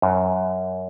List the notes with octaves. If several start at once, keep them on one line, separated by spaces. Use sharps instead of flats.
F#2